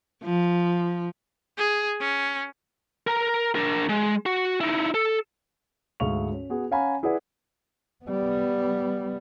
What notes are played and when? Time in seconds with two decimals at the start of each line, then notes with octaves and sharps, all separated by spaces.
0.23 F3
1.58 G#4
2.00 C#4
3.07 A#4 A#5
3.55 D4 A#4
3.89 G#3
4.26 F#4
4.60 D#4 E4
4.94 A4
6.00 D2 G#2 G#4 F5 C#6 F7
6.32 C#4
6.50 B3 F#4 G#4
6.71 C#4 F5 F#5 G#5 A#5 B5
7.03 E4 G#4 B4 D5 F#5
8.05 G3 B3